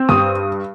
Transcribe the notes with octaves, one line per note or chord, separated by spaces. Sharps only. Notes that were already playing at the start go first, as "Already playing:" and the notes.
Already playing: C4
G2 D#6